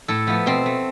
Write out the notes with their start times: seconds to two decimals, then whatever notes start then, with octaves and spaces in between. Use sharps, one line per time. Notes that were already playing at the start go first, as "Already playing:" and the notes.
0.08 A2 A4
0.27 F3 A3 B3
0.46 B2 C4
0.66 A3